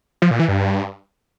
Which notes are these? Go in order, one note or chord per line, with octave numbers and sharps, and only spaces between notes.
F3
A#2
E3
G2